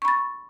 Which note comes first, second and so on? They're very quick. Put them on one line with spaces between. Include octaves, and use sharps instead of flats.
C#6 B5 A6